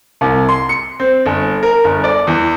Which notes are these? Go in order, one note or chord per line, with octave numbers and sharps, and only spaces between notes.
C2
C6
C#7
C4
G1
A#4
G1
D5
E2